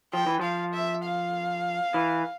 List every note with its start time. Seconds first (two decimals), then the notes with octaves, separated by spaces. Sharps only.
0.13 F3 G5
0.27 E3
0.40 F3 F5
0.74 E5
1.04 F5
1.94 E3